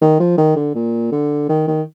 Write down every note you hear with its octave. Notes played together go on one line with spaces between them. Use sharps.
D#3
F3
D#3
D3
A#2
D3
D#3
D#3